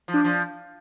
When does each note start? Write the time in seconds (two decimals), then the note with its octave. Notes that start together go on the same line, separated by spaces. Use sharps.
0.08 F3
0.14 D4
0.24 F3